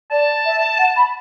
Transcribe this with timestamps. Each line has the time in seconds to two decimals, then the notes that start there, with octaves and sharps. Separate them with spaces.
0.11 D5 A5
0.45 E5
0.79 F#5
0.96 B5